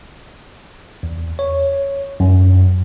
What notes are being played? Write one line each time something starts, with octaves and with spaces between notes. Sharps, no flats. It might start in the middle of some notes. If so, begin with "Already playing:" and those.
E2
C#5
F#2